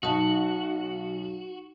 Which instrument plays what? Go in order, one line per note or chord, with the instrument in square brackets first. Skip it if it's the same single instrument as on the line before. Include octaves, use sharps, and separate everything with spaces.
[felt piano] B1 [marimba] D#4 A5 [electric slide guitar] F#4